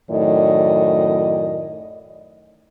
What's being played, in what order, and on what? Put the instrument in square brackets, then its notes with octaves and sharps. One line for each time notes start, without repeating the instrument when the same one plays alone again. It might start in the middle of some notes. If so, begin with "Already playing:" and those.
[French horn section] F#2 A2 D#3 D5 D#5